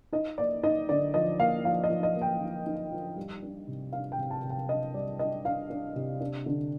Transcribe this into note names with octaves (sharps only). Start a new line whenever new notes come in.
D#4 D#5
A#3 D5
D#4 D#5
D3 D5
F3 D#5
A#3 F5
F3 F5
D#5
F3
D#5
A#3
G5
D#4
D#4
F3
G3
D4
C3
D4 F5
G5
C3
A5
C3
G5
D4 D#5
G3 D5
D4 D#5
D4 F5
D4
C3
D4
D3